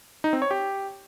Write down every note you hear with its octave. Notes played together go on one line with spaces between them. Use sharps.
D#4
C4
C#5
G4